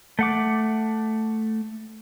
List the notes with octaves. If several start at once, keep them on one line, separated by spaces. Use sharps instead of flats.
A3 F#5 D6